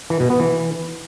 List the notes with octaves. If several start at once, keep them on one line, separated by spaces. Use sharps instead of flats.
E3
B2
B3
E3